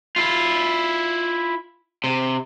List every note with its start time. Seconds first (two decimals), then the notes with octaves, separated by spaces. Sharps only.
0.16 E4 F4
2.04 C3